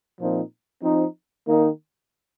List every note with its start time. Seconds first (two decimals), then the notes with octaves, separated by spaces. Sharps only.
0.20 A#2 F3 C4 D#4
0.83 F3 C4 D#4
1.47 D#3 A#3 D#4